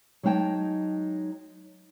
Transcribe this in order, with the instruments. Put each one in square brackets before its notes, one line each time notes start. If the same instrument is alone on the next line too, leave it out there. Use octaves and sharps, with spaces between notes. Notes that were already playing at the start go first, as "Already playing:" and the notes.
[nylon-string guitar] F#3 G#3 D#4 E5 G5 A5